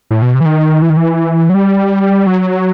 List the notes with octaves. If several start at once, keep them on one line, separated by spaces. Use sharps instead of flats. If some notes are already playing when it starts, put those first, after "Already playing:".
A2
B2
C3
E3
D#3
E3
D#3
E3
F#3
G3
F#3